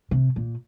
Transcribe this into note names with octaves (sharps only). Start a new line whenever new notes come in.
C3
A#2